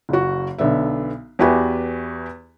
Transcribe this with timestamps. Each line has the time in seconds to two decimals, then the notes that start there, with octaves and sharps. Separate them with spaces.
0.09 F#1 F#4
0.58 B1 D3 B3 E5
1.39 E2 E4 F#4 G4 B4 G#5